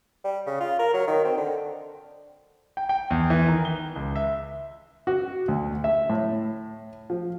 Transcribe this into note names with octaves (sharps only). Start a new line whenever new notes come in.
G3
C#3
F4
A#4
F#3
D#3
C4
D3
G5
G5
E2
E3
D#3
G7
C#2
E5
F#4
D2
E5
A2
F3